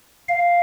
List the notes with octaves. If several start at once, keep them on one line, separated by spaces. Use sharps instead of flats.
F5